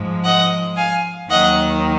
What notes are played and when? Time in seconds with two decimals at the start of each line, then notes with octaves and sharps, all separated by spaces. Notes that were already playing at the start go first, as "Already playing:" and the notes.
Already playing: G#2 F3 G#3
0.24 D#5 F#5
0.77 F5 G#5
1.30 D#2 D#3 F#3 D#5 F#5